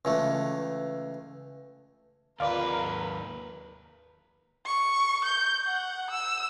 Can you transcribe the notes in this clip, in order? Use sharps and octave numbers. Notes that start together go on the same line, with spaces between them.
C#2 E3 A3
D#2 F4 A#4 B4 D5
C#6
G6
F#5
E6